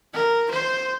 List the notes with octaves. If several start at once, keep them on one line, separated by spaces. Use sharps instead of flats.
A#4
C5